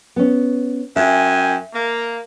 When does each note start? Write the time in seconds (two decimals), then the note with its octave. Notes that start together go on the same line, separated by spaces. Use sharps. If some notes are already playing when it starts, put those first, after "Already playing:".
0.16 B3 C#4
0.96 F#2 E5 G5 G#5
1.74 A#3